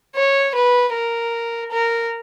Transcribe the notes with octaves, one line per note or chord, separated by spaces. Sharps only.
C#5
B4
A#4
A#4